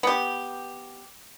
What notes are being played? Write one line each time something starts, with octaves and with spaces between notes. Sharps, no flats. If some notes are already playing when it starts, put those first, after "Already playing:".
B3 G4